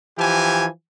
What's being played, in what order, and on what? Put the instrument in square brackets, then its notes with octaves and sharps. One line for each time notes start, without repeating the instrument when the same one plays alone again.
[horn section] E3 F3 G4 G#5